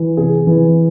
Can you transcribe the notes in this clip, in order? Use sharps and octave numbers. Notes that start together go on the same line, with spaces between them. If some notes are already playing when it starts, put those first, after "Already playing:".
Already playing: E3
C3 G#4
E3